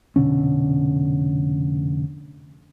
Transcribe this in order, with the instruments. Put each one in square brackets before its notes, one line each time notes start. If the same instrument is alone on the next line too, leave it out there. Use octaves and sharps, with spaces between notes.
[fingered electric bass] F1 B2 D3 C#4